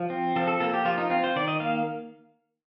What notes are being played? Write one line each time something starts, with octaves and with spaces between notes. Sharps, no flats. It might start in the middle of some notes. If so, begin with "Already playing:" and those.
Already playing: F3
C4
F3 A4
A4
A#3 A4
G4
F3 F4
D#4
C4 F4
C5
D#3 D5
D#5
A#3 F5